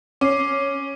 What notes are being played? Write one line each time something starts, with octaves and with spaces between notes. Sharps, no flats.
C#4 D6 C7